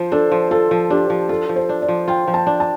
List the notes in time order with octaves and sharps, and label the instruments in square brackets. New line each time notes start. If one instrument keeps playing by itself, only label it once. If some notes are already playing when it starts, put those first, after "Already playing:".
Already playing: [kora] F3 F4 [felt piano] C5
[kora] D4 [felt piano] A4
[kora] F3
[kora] F4 [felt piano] A4
[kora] F3
[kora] D4 [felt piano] G4
[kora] F3
[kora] F4 [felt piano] A4
[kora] F3
[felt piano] C5
[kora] D4
[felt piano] D5
[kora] F3
[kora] F4 [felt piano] G5
[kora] F3
[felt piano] A5
[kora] D4
[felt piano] A5